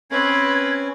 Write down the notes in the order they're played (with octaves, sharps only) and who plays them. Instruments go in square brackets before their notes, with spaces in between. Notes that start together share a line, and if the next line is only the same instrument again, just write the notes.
[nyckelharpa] C4 B4 [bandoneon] C#4 [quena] G#6